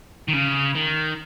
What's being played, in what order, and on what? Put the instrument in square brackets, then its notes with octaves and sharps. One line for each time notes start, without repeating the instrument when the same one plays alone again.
[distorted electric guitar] D#3
C#3
D#3